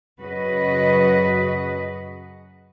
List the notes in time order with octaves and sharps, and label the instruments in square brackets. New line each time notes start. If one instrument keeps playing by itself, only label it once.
[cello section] F#2 C#3 F#4 B4 D#5